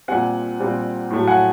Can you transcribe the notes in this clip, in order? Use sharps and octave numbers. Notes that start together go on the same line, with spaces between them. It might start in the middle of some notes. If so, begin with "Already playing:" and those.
A#2 G3 C4 F#5 G#5
A#2 G3 C4
A2 F#3 A3
F#5 G#5